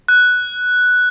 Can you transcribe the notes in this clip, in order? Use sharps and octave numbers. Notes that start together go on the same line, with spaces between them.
F#6